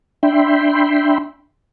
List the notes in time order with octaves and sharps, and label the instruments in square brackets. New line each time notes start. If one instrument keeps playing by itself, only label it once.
[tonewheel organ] D4 E5 G5 B5 C6